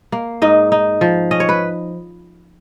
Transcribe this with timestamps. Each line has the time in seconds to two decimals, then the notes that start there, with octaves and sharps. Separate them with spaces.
0.12 A#3
0.42 G#2 D#4 D#5
0.72 D#4
1.01 F3
1.31 C#4 D#5
1.40 C#5
1.49 B4